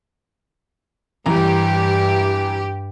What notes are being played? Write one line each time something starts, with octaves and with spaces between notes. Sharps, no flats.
G2 E3 G4 A#5